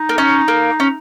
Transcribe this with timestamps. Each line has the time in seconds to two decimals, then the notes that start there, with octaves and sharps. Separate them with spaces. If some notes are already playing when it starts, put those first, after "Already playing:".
Already playing: D#4
0.09 A#3
0.18 C#4
0.48 A#3
0.80 C#4